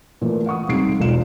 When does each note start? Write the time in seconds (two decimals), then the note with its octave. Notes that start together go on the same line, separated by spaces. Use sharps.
0.21 A#2 E3 A3
0.46 F5 F#5 C#6 D#6
0.68 D#1 C3 G#3 D#4 C7 D7
0.99 E1 B1 F4 F5 E7